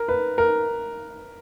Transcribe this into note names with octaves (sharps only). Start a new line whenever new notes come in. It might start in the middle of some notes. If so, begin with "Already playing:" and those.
Already playing: A#4
B4
A#4